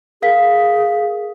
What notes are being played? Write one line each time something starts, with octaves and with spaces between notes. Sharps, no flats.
G#4 A#4 F5 B6